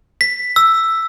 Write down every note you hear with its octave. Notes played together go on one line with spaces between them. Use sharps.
B6
E6